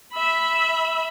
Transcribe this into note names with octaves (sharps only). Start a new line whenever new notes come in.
E5 B5